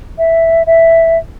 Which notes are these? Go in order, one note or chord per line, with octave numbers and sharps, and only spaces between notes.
E5
E5